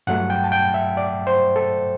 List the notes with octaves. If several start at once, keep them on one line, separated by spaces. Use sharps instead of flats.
G2 F#3 A3 F#5
G5
A5
G5
E5
D5
C5
A4